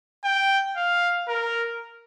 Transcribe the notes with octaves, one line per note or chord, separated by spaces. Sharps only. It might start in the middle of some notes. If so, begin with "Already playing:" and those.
G5
F5
A#4